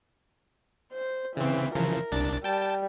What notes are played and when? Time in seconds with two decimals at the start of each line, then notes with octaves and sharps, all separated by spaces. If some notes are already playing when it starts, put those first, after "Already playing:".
0.93 C5
1.37 C#3 E3 C4
1.75 C#3 E3 F3 A#4
2.12 C2 D4 A6
2.44 G3 G5 A5